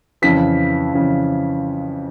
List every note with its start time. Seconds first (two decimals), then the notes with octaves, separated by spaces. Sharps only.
0.22 F2 C#3 E3 B6
0.93 F2 C#3 E3